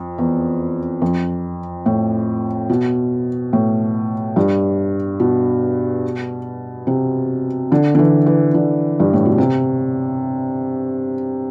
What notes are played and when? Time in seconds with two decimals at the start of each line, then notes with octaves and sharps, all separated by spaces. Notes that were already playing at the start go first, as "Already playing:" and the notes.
Already playing: F2
0.18 E2
1.02 F2
1.86 A2
2.69 B2
3.53 A2
4.36 G2
5.20 B2
6.87 C3
7.72 D3
7.95 D3
7.99 E3
8.26 E3
8.54 D3
9.00 G2
9.13 A2
9.25 B2
9.38 C3